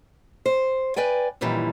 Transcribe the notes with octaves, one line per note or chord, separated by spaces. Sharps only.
C5
B4 D5 G5 G#5
F#2 A#2 D#3 E3 G3